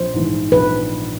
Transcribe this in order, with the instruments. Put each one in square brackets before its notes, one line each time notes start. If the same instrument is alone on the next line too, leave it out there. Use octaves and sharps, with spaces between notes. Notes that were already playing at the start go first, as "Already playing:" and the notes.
Already playing: [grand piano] A#1 [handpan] C5
[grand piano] G#2 E3
[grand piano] A#1 [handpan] B4